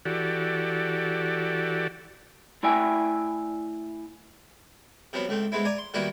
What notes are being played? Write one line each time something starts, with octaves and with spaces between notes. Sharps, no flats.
E3 F#4 G4 A4 D5
A3 E4 D5 E5 G5 G#5
C3 F3 F#3 B3
C#2 A3 C4
G#3 B3 C4 E4
D5 G#5 A#5
C6
D#3 G3 A#3 B3 E4 F#4